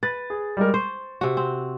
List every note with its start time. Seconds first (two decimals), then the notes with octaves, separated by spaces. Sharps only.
0.03 B4 A6
0.30 G#4
0.57 G3 G#3 A#4
0.74 C5 C#6
1.21 C3 F#4
1.37 C4